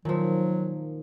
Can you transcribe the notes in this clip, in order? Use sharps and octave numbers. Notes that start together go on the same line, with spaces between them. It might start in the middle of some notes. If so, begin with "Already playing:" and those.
A#2 D#3 F3 F#3